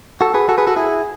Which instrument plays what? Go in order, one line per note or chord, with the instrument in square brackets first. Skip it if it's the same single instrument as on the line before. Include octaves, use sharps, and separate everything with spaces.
[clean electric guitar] F#4 A4
G#4 B4
F#4 A4
G#4 B4
F#4 A4
E4 G#4